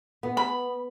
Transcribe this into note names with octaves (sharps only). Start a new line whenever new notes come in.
B3
B5